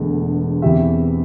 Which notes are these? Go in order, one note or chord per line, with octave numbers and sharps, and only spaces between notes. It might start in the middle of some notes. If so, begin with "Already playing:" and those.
Already playing: E1 E2 D3 A3
E2 E3 C4 G4 E5